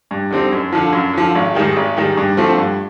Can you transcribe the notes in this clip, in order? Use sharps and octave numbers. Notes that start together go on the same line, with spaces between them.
G2
D3 G3 C4 D#4
F#2
D3 F3
F#2
D3 F3
G#1
G#2 D#3 G3
G#1
G#2 D#3 G3
G2
D3 F3 A3 C4
G2